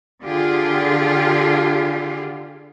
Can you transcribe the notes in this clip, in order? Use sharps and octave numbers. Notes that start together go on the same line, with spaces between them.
D3 F4 G4 G#4